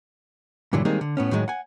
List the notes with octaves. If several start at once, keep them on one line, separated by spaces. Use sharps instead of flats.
G2 A#2 D3 E3 F#3
D#3 G3 G#3 A#3 C4 D#4
D3
A2 B3 C#4
A2 D#3 F#3 G#3
F#5 G#5